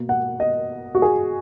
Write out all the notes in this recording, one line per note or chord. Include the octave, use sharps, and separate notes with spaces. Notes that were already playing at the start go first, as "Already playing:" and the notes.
Already playing: B2 A#3
F#5
D#5
F#4
G#4